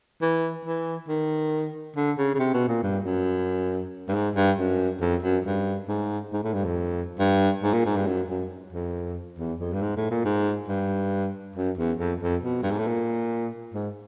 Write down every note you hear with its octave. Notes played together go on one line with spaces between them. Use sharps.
E3
E3
D#3
D3
C#3
C#3
C3
B2
A#2
G2
F#2
G2
G#2
G2
F#2
F2
F#2
G2
G#2
G#2
A2
G2
F2
G2
G#2
A#2
G#2
G2
F#2
F#2
F2
E2
F2
G2
G#2
A2
A#2
G#2
G2
F#2
E2
F2
F2
B2
G2
G#2
A2
A#2
G#2